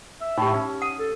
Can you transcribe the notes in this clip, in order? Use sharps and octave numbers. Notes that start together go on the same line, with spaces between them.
E5
A2 D#4 G4
C#4
F#5 D#6
A4